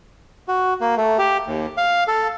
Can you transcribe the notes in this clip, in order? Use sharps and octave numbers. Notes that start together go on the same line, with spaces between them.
F#4
A#3
A3
G4
D#2
F5
A4